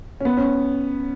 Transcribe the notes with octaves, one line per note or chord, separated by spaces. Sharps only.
C#4
B3
C#4